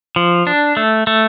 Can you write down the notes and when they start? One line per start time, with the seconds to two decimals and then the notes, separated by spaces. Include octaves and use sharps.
0.16 F3
0.47 D4
0.77 A3
1.07 A3